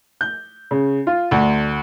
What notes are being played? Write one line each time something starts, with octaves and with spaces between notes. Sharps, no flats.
G6
C#3
F4
D2